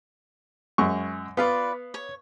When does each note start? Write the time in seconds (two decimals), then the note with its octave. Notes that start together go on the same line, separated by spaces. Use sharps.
0.78 F#2 G#3 C#6
1.37 B3 F4 B4 D5 F5
1.94 C#5